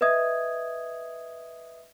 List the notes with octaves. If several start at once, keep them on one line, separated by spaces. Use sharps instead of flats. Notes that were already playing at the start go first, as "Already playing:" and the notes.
B4 D#5 E5 D#6 G#6